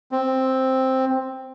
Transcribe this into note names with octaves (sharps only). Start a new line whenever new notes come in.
C4